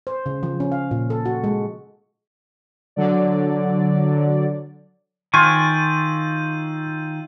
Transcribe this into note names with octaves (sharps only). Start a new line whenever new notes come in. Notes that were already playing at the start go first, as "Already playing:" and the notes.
C5
C#3
F3
C#4
F5
A#2
A4
F#4
G#3
D3 F#3 D5
D#3 F4 G#5 C#6 E6 G6 D#7